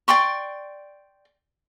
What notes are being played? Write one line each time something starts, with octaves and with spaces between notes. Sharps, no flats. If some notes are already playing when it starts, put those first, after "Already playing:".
D5 G5 C6 C#6